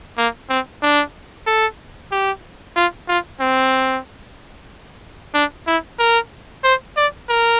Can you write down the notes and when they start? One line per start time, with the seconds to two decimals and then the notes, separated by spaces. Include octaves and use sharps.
0.18 A#3
0.50 C4
0.82 D4
1.47 A4
2.12 G4
2.76 F4
3.08 F4
3.40 C4
5.34 D4
5.67 E4
5.99 A#4
6.64 C5
6.97 D5
7.29 A#4